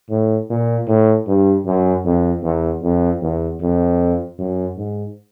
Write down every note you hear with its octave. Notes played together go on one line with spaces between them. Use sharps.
A2
A#2
A2
G2
F#2
F2
E2
F2
E2
F2
F#2
G#2